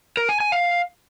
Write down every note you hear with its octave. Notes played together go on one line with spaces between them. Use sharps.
A#4
G#5
G#5
F5